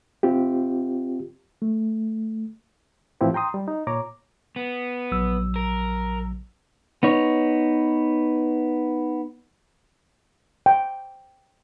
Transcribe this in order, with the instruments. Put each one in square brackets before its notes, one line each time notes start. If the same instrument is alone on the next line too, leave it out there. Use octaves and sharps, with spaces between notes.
[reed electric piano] C4 F4 G4
A3
A2 E3 F3 C4 E4 G4
G5 A#5 C6 D#6
G3
D#4
A#2 C#5 A#5 D6
[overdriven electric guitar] B3
[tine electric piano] A#1 F#3 E6
[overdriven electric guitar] A#4
[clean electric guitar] B3 D#4 C#5
[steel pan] G5